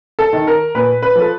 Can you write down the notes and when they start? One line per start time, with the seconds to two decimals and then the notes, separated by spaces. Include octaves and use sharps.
0.19 A4
0.33 D#3
0.47 A#4
0.75 A#2 B4
1.02 B4
1.15 F3 A4